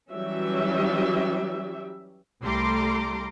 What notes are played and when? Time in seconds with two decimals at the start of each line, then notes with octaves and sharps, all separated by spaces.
0.13 E3 F#3 G3 C#4 G4 E5
2.42 C2 G3 A3 A#5 C6 D6